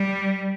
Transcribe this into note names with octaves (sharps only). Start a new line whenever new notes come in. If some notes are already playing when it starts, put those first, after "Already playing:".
Already playing: G3